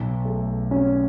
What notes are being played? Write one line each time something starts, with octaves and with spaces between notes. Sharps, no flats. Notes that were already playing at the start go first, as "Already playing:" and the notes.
Already playing: B1
A3
C#4